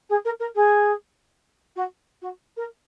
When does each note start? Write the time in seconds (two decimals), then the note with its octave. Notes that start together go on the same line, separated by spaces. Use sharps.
0.09 G#4
0.24 A#4
0.39 A#4
0.55 G#4
1.75 F#4
2.21 F#4
2.56 A#4